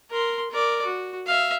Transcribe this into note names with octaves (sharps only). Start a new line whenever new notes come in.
A#4 C6
A#4 D5
F#4
E5 F5